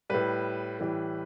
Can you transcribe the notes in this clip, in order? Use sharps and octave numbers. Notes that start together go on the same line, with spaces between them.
A2 G3 B4
A2 E3 G3